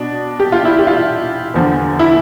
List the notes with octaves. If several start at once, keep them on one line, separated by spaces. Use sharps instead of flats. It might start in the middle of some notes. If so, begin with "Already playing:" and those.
Already playing: B2 D4
G4
F4
E4
G4
F4
E2 D3 F3
E4